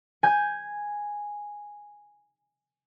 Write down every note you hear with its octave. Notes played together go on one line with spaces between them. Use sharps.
G#5 G6